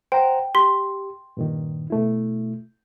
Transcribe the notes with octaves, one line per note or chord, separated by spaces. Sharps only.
C5 F#5 G5 A#5
G4 C6 B6
G2 A#2 D#3
B2 A3 E4